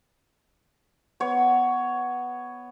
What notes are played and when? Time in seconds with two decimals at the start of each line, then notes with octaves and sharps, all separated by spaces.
1.20 B3 C#5